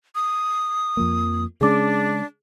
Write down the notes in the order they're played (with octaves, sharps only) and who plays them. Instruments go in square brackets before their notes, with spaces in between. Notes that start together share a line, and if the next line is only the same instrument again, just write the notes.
[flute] D#6
[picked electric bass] F2 F3 A#3
[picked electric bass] C#3 G#3 C#4 [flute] D4 [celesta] G#4 D6